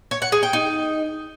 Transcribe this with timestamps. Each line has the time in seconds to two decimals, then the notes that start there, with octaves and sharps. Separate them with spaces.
0.11 C#5
0.22 F#5
0.32 G#4
0.43 G5
0.53 D#4